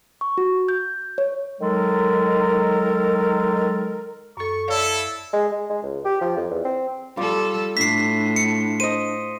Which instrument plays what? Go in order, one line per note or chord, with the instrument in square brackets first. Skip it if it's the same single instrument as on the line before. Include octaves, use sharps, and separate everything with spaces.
[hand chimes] C#6
F#4
G6
C#5
[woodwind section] D#3 F#3 G#3 A4 A#4
[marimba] F#2 A4 [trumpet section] C#6
[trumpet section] E4 A4 [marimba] C#5 D5 F5
[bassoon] G#3
G#3
G#3
C#2
G4
F3
F2
E2
C4
[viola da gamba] G3 A4 [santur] F4 D6
[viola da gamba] A2 [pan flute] D4 [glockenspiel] B6 C7
[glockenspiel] C#7
[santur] C5 D#5 [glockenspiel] D#7